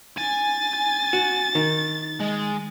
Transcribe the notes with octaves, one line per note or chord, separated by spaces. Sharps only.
G#5 A6
F#4
D#3
G#3